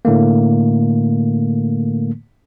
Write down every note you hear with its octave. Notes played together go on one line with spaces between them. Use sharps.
A2 D3 A3 A#3